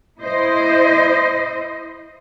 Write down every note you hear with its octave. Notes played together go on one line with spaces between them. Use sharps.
E4 C5 D#5